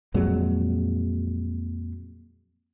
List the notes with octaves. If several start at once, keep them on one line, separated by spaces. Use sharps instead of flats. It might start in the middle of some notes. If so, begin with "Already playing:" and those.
F2 A#2 F#3 G#3